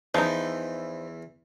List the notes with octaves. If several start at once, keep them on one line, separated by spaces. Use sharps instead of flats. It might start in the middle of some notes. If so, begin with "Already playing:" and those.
E2 E3 F3 D#4